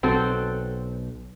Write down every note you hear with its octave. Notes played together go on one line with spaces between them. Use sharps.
B1 C4 F#4 A4